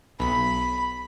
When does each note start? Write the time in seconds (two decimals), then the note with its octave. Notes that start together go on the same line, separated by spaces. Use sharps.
0.20 B1 B5 B6